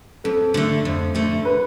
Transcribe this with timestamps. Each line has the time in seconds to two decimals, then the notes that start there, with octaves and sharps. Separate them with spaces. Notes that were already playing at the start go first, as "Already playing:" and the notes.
0.24 F2 A4
0.54 D3 A3
0.85 F2
1.15 D3 A3
1.45 B4